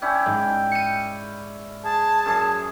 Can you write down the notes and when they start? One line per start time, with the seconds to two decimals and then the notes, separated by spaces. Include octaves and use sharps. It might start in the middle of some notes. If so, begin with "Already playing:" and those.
0.02 C#4 E4 D5 G5
0.26 G#2 G#3
0.71 C#7 D#7
1.84 G#4 A5
2.26 F#2 G#4